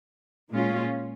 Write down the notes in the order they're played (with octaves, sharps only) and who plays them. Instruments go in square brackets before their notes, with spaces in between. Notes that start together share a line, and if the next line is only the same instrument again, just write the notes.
[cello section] A#2 G#3 C#4 F4